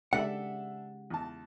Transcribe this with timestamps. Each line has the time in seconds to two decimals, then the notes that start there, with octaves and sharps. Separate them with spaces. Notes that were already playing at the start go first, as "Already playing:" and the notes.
0.13 C#3 G#3 D4 G4 A4 E5 F#5
1.10 E2 A5